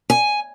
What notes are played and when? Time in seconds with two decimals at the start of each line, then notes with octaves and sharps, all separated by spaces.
0.10 G#5